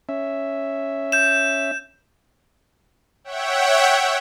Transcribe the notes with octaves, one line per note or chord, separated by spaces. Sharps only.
C#4 E5
G6 E7
C#5 E5 F#5 G5